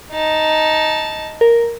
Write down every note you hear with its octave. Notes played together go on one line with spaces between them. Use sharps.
D#4 A5
A#4